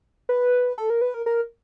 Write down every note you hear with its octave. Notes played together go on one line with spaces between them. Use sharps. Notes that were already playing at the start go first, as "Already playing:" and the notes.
B4
A4
A#4
B4
A#4
A#4